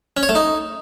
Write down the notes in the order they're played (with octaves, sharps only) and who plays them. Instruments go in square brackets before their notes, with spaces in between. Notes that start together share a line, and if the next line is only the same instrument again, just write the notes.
[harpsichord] C#4
C#5
A3
D#4